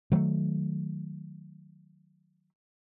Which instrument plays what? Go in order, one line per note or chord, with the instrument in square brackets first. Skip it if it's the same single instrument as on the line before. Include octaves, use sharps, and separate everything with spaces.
[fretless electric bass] D#3 F#3 G3 A3